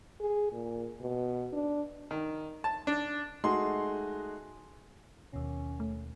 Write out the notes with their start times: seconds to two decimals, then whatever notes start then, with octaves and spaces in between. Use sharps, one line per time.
0.21 G#4
0.52 A#2
1.00 B2
1.53 D4
2.11 D#3
2.64 A5
2.87 D4
3.44 G#3 A3 D#4 F#4 G#4 C6
5.33 D#2 B2 C#4
5.80 A3